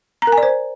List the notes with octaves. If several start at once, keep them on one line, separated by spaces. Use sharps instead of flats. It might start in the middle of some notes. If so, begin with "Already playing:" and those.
A#5
A#4
G#5
D5
C5